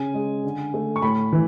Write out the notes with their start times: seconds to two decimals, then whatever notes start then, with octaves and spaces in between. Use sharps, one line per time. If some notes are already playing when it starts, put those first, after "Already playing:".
Already playing: C#3 G#5
0.14 G#3
0.44 D3
0.74 A3
0.96 C#6
1.02 A2 B5
1.33 E3